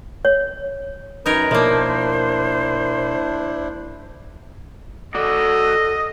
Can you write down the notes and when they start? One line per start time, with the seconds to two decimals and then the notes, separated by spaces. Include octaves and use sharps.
0.25 C#5
1.26 F#2 D#4 A#4 B4 C#5
1.51 B2 F3 A#3 D4 E4 A#4 C5 C#5
5.15 F#4 A4 D5 D#5